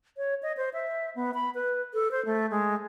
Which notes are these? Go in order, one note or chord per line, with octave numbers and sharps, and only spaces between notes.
C#5
D#5
C5
E5
B3
B5
B4
A4
C5
A3
G#3